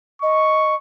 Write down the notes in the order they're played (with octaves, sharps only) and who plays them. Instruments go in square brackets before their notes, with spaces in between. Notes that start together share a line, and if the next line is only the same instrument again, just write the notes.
[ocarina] D#5 [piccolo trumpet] C#6